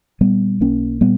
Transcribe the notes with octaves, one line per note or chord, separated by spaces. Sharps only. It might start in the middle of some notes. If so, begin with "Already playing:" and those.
A#2 G3 B3
B1 A#3 C#4
A#2 G3 B3